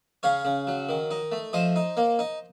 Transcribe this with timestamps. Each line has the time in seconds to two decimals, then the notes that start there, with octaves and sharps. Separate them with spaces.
0.23 C#3 C#5 F5
0.45 C#3
0.67 F#3
0.89 D#3
1.11 D#4
1.32 A3
1.53 F3 C5 D#5
1.76 D#4
1.97 A#3
2.19 D#4